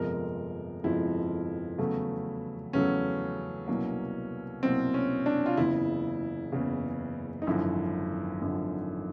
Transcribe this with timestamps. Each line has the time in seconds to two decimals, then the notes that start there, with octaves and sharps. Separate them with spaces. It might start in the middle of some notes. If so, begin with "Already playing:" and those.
Already playing: G1 F2 C3 F3 G#3 A#4
0.84 G1 F2 C3 F3 G#3 E4
1.78 E2 C#3 F#3 A3
2.73 E2 C#3 F#3 A3 C#4
3.68 C2 B2 F#3 A#3
4.63 C2 B2 F#3 A#3 C4
4.94 C#4
5.26 D4
5.46 F4
5.57 F#1 E2 C#3 E4
6.52 F#1 E2 C#3
7.42 D#4
7.47 G#1 F#2 D3 F3 E4
8.41 G#1 F#2 D3 F3